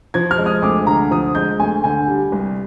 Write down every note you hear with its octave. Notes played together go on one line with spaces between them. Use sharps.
F3 G#6
F6
G#3
D#6
D2 D6
D3 A#5
F3 D#6
G#3 G6
D2 G#5
D3 G#5
G3
C2